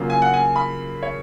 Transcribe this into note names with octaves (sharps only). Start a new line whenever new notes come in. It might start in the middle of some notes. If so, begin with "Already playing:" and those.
Already playing: C#3 F#3 A#3 F4
G#5
F#5
G#5
B5
C#5